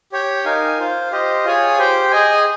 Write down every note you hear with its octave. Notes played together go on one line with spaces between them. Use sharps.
G4 C#5 G5
D#4 A#4 F5 G#5
F4 C5 F5
G4 C5 D#5
F4 G#4 C#5 G#5
G4 C5 G5
G#4 D#5 G#5